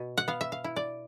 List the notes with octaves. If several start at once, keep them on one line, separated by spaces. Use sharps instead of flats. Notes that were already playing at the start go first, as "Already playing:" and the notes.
Already playing: B2
F#5
B3 F5
E5
F5
E4
D5